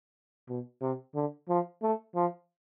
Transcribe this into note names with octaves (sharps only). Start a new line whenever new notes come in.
B2
C3
D3
F3
A3
F3